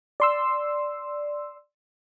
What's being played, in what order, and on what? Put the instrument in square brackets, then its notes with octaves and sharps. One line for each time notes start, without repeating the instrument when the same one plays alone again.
[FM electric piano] D5 C6 E6